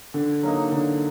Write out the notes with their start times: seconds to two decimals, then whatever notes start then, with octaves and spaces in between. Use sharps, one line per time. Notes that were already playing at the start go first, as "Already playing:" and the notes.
0.14 D3
0.43 F#3 A#3 D#4
0.72 D3